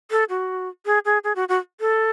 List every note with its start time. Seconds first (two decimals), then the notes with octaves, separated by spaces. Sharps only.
0.11 A4
0.29 F#4
0.86 G#4
1.05 G#4
1.24 G#4
1.36 F#4
1.49 F#4
1.80 A4